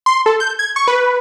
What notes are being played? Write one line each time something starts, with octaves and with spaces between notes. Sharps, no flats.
C6
A4
G6
G#6
C#6
B4